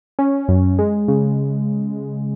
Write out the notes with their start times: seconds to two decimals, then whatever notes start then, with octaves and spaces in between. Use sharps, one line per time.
0.19 C#4
0.48 F#2
0.79 G#3
1.08 C#3